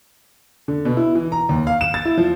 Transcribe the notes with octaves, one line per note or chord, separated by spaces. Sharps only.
D3
B2
E4
E3
A#5
D#2
F5
E7
A6
E4
F3